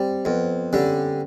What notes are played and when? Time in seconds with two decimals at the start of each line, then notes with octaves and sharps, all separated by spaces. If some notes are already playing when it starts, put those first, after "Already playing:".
Already playing: G3 C4
0.25 F2 B3
0.72 D3 G3 C#4